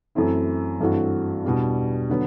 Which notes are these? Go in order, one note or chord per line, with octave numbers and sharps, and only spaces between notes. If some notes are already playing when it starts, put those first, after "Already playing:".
F#2 E3 A3 C4 E4
G2 E3 A3 C4 F#4
E2 B2 G3 D4
D3 F#3 B3